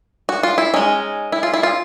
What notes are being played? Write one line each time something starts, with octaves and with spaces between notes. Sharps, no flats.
F#4
F4
E4
G#3 C#4 D#4
E4
F4
E4
F4